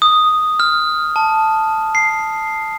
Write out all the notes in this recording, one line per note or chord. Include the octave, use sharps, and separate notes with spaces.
D#6
F6
A5
C7